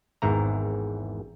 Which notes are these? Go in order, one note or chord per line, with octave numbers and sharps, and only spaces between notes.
G#1 E2 G#2 E3 A#5